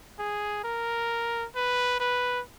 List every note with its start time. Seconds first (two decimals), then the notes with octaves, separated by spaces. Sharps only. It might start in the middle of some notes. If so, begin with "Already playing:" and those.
0.19 G#4
0.64 A#4
1.56 B4
2.00 B4